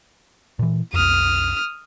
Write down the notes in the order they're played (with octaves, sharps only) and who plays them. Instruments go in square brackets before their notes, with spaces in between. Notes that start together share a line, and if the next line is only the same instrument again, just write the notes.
[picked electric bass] A#2 E3
[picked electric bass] B1 F2 [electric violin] D#6 F6